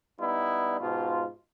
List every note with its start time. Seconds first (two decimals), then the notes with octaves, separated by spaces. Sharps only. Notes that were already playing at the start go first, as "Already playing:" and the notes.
0.20 G3 B3 D#4 E4
0.81 G#2 B2 F4